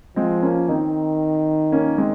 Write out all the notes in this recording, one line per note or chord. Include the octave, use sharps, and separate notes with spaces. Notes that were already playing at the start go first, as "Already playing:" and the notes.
F3 G#3 C4
A#3 C#4
D#3 C4 D#4
A#3 C#4
G#3 C4